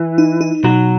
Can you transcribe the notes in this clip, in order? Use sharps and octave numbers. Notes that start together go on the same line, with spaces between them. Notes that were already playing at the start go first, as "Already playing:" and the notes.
Already playing: E3
D#4
D#4
B2 F#3